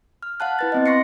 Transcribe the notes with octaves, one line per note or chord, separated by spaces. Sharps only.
F6
F5 F#5 A5 F#6
E4 B4 A6
B3 C4 D#5
C6 C#6 A#6 C7 C#7